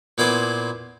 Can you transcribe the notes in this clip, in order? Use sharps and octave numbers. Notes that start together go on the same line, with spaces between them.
A#2 B3 E4 C5 G#5 D6